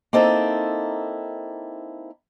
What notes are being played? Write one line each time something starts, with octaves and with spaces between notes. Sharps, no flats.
A#3 C4 D#4 E4 A4